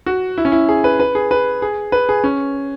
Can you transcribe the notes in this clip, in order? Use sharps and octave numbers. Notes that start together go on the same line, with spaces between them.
F#4
E4
C#4
E4
G#4
B4
B4
G#4
B4
G#4
B4
G#4
C#4